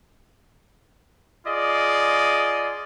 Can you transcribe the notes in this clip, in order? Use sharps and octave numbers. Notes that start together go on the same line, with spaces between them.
F4 G#4 D5 D#5